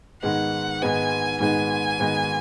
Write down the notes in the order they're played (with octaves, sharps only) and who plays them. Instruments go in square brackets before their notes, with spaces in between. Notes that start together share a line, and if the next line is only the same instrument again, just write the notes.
[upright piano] G#2 D#3 G#3 B3 D#4 [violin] F#5
[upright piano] G#2 D#3 G#3 B3 D#4 [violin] G#5
[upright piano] G#2 D#3 G#3 B3 D#4 [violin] G#5
[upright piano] G#2 D#3 G#3 B3 D#4